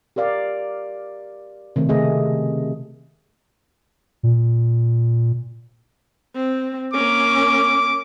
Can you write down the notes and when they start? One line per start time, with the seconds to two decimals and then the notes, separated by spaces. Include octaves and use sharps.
0.16 G4 A#4 D5 F5
1.76 C3 D#3 A3
1.89 C#3 A3 G#4 D#5
4.23 A#2
6.35 C4
6.93 A#3 C#4 D6